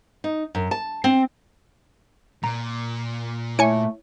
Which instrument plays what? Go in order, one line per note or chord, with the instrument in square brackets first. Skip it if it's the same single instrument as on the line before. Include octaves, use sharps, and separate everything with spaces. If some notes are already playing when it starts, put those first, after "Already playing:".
[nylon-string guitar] D#4
F#2
A5
C4
[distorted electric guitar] A#2 [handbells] A#5
[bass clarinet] A3 [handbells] E4 C#5 [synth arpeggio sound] G#5 C#7